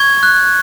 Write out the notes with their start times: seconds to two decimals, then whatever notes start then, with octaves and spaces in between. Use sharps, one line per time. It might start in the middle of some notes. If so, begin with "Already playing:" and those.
Already playing: C#6 G#6
0.23 F#6